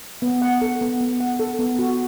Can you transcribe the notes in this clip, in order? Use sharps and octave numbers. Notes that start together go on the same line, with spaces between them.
B3
F#5
A4
B3
B3
F#5
A4
B3
F#4